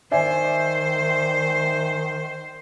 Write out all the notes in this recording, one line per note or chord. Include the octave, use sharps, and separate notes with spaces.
D#3 C5 D5 E5 G#5